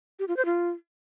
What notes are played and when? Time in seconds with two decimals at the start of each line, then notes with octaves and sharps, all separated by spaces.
0.19 G4
0.28 F4
0.37 C5
0.45 F4